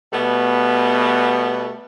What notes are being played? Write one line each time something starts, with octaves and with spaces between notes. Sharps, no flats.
B2 G3 A3 B3